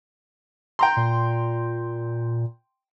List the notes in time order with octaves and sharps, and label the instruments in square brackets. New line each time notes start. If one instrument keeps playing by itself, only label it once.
[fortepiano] G5 A#5 C6
[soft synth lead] A#2